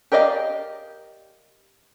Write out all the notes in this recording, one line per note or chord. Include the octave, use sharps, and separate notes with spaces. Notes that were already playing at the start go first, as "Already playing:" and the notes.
G4 A#4 D5 D#5 F5